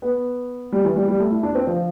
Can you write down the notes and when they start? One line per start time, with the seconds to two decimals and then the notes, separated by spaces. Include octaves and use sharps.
0.02 B3
0.72 G3
0.85 E3
0.96 G3
1.08 G3
1.20 A3
1.31 E4
1.43 D4
1.55 C4
1.67 F3